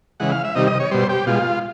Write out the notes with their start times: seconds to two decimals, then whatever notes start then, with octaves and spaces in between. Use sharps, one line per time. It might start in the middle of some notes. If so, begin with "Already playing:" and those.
0.20 C#3 E3 G#3 F#5
0.32 F5
0.44 E5
0.55 C3 D#3 G3 D#5
0.68 D#5
0.80 C#5
0.91 B2 G3 C5
1.09 G4
1.26 B2 G#3 F4